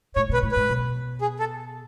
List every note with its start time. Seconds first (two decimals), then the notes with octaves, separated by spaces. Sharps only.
0.16 A2 C#5
0.29 B2 B4
0.43 A2
0.52 G#2 B4
0.69 B2
1.21 G#4
1.39 A4